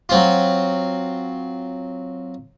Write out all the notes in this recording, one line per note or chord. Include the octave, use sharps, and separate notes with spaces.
F#3 C4 F4